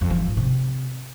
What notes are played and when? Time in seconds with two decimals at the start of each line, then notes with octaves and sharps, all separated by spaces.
0.01 F2
0.10 F3
0.19 F#2
0.28 G#2
0.37 C3